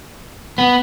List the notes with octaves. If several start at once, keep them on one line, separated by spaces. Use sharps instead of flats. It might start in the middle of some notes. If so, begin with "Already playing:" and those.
B3